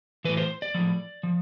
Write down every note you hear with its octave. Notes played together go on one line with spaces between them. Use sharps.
A2 E3 B4
C5
D5
A2 F3
F3